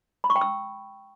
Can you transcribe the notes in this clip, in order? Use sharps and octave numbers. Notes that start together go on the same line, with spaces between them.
B5
C#6
G5
E6